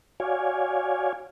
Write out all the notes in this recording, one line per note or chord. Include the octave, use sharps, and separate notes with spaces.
F#4 C#5 D5 F5 G#5